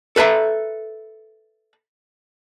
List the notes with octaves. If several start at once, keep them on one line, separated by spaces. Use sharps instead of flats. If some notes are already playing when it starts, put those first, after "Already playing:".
A4 B4 E5 A#5